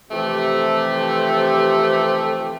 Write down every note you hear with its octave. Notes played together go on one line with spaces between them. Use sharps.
C3 E3 F3 A3 G4